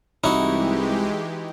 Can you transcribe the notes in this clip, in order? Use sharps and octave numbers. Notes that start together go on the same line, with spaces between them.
C2 E3 G#3 D#4 E4 F#4 G4